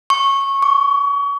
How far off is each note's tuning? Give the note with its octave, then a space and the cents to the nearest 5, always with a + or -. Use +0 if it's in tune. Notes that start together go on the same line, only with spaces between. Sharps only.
C#6 -15
C#6 +35